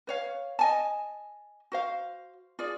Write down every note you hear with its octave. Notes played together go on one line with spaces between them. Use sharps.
B4 C#5 F5
D#5 G#5 A5
F#4 C5 F5
F4 G#4 D5